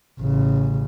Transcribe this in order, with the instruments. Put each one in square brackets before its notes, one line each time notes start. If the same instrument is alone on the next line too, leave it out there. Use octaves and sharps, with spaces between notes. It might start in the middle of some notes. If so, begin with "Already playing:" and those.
[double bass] A1 C#3